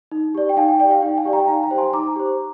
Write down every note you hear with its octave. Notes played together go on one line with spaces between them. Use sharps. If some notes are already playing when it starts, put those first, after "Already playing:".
D#4
G4 D5
G5
D#4 F5 G#5
G5
G4 D5 G5
F5
D#4 G5
F5 G#5
G4 D5
G5 A#5
D#4 F5 G#5
G5 A#5
G4 C5
G#5 C6
D#4 A#5 D6
G4 C5